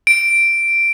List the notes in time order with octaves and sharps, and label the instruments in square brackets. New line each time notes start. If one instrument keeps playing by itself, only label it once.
[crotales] D7